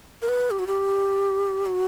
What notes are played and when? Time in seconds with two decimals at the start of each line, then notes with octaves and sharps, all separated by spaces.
0.22 A#4
0.28 B4
0.51 G4
0.59 F#4
0.67 G4
1.66 F#4